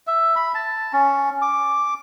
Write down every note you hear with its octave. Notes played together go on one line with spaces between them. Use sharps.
E5
B5
A5
C#4
D6